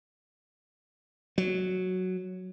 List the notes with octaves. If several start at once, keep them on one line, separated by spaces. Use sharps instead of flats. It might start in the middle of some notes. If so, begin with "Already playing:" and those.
F#3